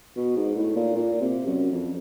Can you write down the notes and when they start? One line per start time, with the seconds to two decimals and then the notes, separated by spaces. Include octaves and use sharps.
0.17 B2
0.37 G#2
0.56 A2
0.76 A#2
0.95 A#2
1.21 C3
1.47 F#2
1.72 F2